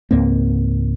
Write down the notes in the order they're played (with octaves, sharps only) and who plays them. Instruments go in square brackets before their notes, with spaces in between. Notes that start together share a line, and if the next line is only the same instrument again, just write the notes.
[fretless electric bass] C#2 G#2 A#3 C4